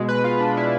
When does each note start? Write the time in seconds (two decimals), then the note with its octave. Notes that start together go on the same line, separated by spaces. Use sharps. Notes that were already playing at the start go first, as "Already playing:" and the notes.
Already playing: B2 G#3
0.09 B4
0.24 F4
0.40 D4
0.57 E4